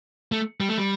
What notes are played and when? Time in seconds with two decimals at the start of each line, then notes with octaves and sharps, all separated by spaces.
0.32 A3
0.60 G3
0.69 A3
0.78 G3